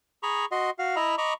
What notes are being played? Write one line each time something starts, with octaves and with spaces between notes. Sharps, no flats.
G#4 A#5 B5 C#6
F#4 D#5 C6
F#4 F5
E4 D#5 E5 A#5 B5
D#5 A#5 B5 C#6 D6